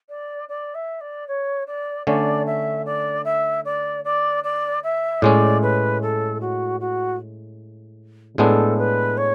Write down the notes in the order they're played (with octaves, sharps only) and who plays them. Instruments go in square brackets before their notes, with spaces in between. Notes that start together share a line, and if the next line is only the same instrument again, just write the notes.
[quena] D5
D5
E5
D5
C#5
D5
[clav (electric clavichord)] D3 A3 C#4 [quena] D5
[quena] E5
D5
E5
D5
D5
D5
E5
[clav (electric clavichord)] A2 G#3 C#4 [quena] D5
[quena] B4
A4
F#4
F#4
[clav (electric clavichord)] A2 G#3 B3 D4 [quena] A4
[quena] B4
C#5